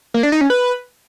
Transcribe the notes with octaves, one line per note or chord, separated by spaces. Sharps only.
A#3
D4
D#4
C#4
B4